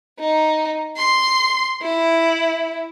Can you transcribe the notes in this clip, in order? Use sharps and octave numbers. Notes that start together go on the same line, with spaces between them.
D#4
C6
E4